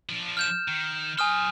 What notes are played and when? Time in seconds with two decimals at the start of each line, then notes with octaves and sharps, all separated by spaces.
0.09 F3 D4
0.37 F6 G6 E7
0.68 D#3
1.19 F#3 G#5 C6 D#6 F6